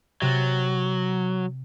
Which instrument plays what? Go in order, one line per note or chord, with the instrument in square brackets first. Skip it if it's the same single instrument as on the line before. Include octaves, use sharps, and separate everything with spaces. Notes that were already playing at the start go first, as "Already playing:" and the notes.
[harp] C3 F#6 A6 [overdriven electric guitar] F#3